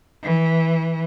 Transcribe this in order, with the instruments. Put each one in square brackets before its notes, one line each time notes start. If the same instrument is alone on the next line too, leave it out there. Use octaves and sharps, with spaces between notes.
[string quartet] E3